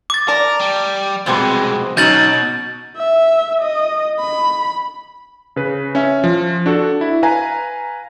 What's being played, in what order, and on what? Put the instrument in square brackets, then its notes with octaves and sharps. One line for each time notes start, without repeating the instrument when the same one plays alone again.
[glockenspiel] D6 A6
[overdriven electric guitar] A#4 [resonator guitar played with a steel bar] D5 A5
[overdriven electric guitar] G3
[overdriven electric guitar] C2 G#3 [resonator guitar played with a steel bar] F2 B2 C4
[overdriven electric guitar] B2 [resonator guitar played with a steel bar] F#3 C#4 D#4 [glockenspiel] G6 A6 F#7
[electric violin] E5
D#5
B5
[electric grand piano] C#3 B4
C#4 E5
F3
D4 F#4 A4
E4
B4 F5 G#5 A#5